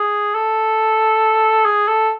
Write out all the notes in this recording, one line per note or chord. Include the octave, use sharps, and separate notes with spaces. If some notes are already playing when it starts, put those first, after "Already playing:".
Already playing: G#4
A4
G#4
A4